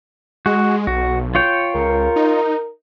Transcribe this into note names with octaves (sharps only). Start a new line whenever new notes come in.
G#3 F#4
B1 F#4
F4 C#5 G5
C#2 A#4
D#4